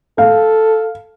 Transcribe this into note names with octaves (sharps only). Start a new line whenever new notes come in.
A4 F5